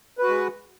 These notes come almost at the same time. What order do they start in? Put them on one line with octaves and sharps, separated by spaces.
B4 F#4 G#3